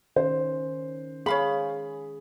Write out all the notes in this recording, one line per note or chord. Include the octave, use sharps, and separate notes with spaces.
D#3 C#4 C5
G#4 C#5 F5 B5